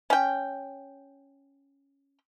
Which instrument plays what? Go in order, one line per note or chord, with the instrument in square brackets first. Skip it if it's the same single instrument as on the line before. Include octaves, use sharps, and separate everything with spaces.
[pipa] C#4 G5